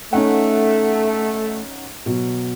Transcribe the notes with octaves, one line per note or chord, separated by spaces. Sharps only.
A3 C#4 D#4 F#5
B2 F#3